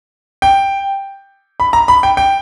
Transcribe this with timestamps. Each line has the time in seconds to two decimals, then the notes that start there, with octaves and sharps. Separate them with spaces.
0.42 G5
1.60 B5
1.73 A#5
1.88 B5
2.03 G5
2.17 G5